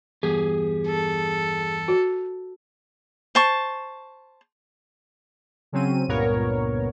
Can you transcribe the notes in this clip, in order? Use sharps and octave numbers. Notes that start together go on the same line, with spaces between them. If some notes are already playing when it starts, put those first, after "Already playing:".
E2 G2 G4 G#4
A4
F#4
C5 A5 C#6
C#3 F#3 C4 C#4 D#7
C#2 G2 A#2 B3 A#4 C#5